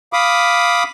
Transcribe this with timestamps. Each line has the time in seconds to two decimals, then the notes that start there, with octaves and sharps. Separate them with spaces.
0.13 F5 B5 D6 D#6